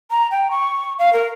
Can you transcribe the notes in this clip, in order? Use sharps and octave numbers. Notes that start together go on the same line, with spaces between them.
A#5
G5
C#6
F5
A#4